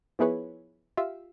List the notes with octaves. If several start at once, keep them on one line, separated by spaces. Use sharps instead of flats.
F3 B3 E4 G#4 B4 C#5
F4 G4 E5